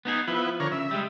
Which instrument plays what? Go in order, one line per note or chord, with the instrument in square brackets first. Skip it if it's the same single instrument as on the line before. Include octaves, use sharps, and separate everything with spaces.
[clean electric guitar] B3 D#4 G#4
[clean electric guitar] F3 [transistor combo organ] B3 E4
[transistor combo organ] D3 A#4 C#5
[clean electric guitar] C#3 [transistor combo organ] E5
[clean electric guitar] G3 G#3